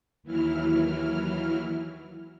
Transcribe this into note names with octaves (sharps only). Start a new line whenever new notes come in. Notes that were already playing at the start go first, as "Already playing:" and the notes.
D#2 E3 F#3 E4 F6